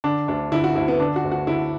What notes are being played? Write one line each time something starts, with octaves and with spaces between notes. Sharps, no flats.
D3 D4
D2 D4
D3 E4
F#4
D2 E4
B3
D3 D4
F#4
D2
F#4
D3 E4